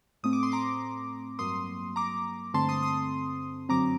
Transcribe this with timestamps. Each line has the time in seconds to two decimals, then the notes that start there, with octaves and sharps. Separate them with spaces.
0.23 A2 A3 C4 D#6
0.33 D6
0.43 C6
0.52 A#5 D6
1.39 G2 F#3 A#3 C6 D#6
1.96 A#5 D6
2.54 G2 D3 A3 C4 A5 C6
2.69 C6 D#6
2.83 C6 D#6
3.69 F#2 D3 F#3 C4 A#5 D6